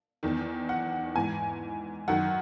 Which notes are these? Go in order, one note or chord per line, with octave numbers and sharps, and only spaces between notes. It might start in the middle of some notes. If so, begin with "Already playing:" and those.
E2 D#3
F#5
G#2 E3 G#5
F#2 D#3 F#5